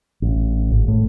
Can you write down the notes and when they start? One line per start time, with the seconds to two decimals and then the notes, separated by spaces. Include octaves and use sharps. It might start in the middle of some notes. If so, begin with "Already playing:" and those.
0.22 A1
0.70 G#1
0.88 A2